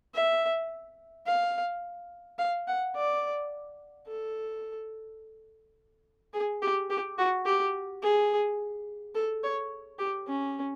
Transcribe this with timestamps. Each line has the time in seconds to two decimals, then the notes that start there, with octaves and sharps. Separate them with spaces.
0.14 E5
1.26 F5
2.38 F5
2.68 F#5
2.95 D5
4.07 A4
6.33 G#4
6.62 G4
6.90 G4
7.18 F#4
7.46 G4
8.02 G#4
9.15 A4
9.44 C#5
9.99 G4
10.28 C#4